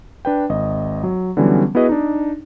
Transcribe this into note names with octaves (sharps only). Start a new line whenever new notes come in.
D4 B4 G5
G#1 D#5
F#3
D3 E3 F#3 G3 B3 C#4
B3 E4 F#4 G#4 B4 D#5
D4 D#4